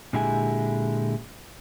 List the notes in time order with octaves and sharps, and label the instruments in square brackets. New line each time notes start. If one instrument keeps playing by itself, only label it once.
[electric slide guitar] A#2 D3 G#3 E4 G4 G#5